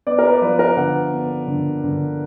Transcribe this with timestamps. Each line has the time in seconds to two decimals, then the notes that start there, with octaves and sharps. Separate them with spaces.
0.07 B3 D5
0.19 A#4
0.25 B4
0.34 D5
0.42 F3 B4
0.59 A#4
0.77 D3 F#5
1.13 B3
1.48 D3
1.84 D3